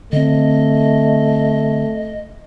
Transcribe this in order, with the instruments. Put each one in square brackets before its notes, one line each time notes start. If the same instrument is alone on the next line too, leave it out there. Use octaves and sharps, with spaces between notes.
[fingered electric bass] D3 C4 [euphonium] A3 [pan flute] D#5